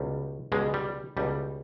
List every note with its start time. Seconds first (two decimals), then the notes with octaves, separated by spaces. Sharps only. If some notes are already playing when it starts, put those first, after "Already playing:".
Already playing: C#2 B2 G3
0.52 C#2 B2 G3 G#3
0.74 G3
1.17 C#2 B2 G3